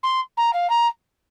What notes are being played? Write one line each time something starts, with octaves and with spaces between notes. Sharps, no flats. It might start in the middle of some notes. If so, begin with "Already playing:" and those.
C6
A#5
F5
A#5